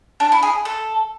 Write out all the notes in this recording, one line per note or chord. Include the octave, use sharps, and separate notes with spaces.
D4
E4
G#4
A4